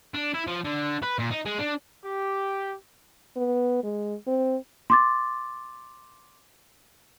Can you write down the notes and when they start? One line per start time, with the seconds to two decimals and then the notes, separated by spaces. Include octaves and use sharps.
0.14 D4
0.34 E4
0.47 F3
0.64 D3
1.02 B4
1.19 A#2
1.31 D#4
1.45 G#3
1.59 D4
2.03 G4
3.37 B3
3.84 G#3
4.27 C4
4.90 C6 D6 A6